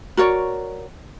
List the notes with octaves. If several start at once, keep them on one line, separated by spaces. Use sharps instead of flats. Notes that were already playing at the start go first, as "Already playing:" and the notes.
F#4 A#4 C#5 D5